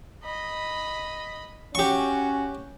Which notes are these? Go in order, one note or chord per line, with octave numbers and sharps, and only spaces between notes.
D#5 B5
C#4 F#4 G4 C#6